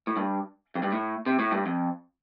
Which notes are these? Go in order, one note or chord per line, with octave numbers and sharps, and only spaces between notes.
A2
G2
F2
G2
A2
C3
A2
G2
F2